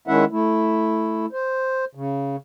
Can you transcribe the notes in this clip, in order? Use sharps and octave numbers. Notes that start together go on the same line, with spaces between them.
D#3 G#3 C#4 E4 E5 F#5
A3 E4
C5
C#3